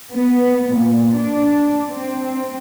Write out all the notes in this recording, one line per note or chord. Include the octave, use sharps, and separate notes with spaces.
B3
A#2
D4
C4